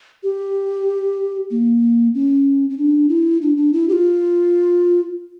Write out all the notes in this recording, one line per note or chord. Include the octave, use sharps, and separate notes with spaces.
G4
A#3
C#4
C#4
D4
E4
D4
D4
E4
G4
F4